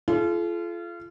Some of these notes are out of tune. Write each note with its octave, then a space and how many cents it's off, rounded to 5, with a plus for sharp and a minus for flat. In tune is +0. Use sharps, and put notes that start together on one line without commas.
F4 -30 A4 -45